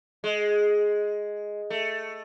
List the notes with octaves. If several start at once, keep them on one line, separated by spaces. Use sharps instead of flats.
G#3
A3